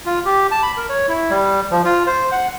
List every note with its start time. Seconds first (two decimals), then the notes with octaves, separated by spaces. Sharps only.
0.06 F4
0.25 G4
0.51 A5
0.63 B5
0.77 A#4
0.89 C#5
1.08 E4
1.30 G3
1.71 F3
1.85 F4
2.07 C5
2.32 F#5